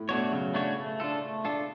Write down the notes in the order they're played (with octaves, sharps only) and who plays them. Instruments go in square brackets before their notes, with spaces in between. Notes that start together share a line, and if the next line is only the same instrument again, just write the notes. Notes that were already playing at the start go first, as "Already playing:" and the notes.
Already playing: [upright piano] A2
[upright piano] B2 [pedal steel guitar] A3 D4 F#4 C#5
[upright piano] C#3 [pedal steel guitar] F#3
[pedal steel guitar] A3 D4 F#4 C#5
A3
D4 F4 A4
A3
D4 F4 A4